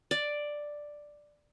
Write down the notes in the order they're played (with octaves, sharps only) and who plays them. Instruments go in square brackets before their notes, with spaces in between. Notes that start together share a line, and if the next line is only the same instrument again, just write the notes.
[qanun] D5